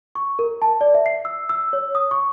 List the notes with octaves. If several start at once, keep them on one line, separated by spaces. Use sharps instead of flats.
C#6
A#4
A5
D5
E5
C7
E6
E6
C#5
D#6
C#6